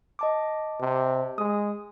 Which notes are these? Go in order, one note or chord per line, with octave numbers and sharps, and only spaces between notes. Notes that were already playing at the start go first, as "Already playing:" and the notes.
D#5 A5 D6
C3
G#3 D#6